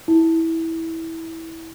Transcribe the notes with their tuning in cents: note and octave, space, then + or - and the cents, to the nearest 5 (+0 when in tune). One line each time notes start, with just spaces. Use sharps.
E4 -15